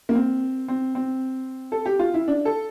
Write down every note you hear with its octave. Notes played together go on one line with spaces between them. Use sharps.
A#3
C4
C4
C4
A4
G4
F4
E4
D4
A4